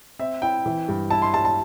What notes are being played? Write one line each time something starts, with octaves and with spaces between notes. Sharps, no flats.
C4 E5
E4 G5
E3
G2
E4 A5
C6
G3 A5
A5